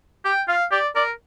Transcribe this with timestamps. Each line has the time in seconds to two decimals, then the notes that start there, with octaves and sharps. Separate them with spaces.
0.25 G4 G5
0.48 F4 F5
0.71 G4 D5
0.95 A#4 D5